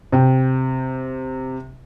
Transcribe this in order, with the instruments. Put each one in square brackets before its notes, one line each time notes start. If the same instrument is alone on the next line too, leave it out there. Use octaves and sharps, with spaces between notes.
[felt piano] C3 G5